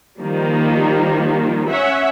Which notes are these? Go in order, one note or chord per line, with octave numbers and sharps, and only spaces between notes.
D#3 F3 G3 A#3
C#4 C#5 E5 F#5